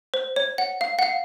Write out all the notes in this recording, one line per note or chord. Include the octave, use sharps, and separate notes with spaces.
C5
C#5
F#5
F5
F#5
F5